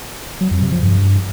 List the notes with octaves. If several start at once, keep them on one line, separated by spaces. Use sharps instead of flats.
F#3
F2
C3
F3
G2